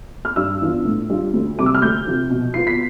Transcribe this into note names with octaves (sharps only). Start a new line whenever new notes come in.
F6
G2 E6
E3 B3 D4 F4
A2
G3 D4 F4
D2
C3 G3 D6
E6
F6
D2 G6
C3 F3
B2
B3 F4 C7
B6